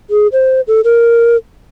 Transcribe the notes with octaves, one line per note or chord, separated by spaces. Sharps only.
G#4
C5
A4
A#4